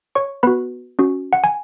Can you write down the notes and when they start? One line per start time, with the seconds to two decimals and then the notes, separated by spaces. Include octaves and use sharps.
0.15 C#5 C#6
0.43 B3 F#4 B4 B5
0.99 C#4 F#4
1.33 F#5
1.44 G#5